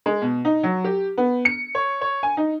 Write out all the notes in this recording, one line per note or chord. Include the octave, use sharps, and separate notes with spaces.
G#3
B2
D#4
F#3
G4
B3
C#7
C#5
C#5
G#5
D#4